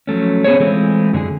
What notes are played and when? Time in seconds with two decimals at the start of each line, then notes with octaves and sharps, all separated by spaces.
0.07 F3 F#3 A3 C#4
0.44 B3 C#4 F#4 G#4 C5 C#5
0.60 E3 G#3 A3 C4 F4
1.13 F#2 D3 D4 G#4